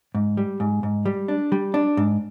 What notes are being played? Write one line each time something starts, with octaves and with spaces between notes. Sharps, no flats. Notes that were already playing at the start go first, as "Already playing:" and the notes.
G#2
G3
G#2
G#2
G3
D4
G3
D4
G#2